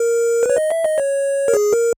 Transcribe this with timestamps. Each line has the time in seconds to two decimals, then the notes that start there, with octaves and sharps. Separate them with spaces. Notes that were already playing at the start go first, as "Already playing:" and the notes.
Already playing: A#4
0.43 B4
0.50 C#5
0.57 D#5
0.71 E5
0.85 D#5
0.98 C#5
1.48 A#4
1.54 G#4
1.73 A#4